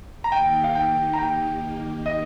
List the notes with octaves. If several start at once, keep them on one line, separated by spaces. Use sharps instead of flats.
A#5
D#3 A#3 D#4 G4 G5
F5
G5
A#5
G5
D#5